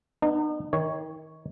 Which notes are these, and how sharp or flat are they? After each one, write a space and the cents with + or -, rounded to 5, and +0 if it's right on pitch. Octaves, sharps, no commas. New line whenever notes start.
B3 +0 D#4 -40
D#3 +30 C#5 +0